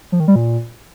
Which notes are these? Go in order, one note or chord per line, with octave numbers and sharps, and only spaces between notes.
F3
D#3
G3
A#2